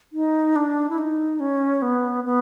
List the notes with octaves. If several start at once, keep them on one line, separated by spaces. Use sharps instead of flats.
D#4
D4
E4
D#4
C#4
B3
B3